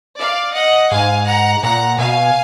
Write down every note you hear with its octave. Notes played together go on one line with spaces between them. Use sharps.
D5 F5
D#5 F#5
G#2 F5 G#5
F#5 A#5
A#2 F#5 A#5
B2 F5 G#5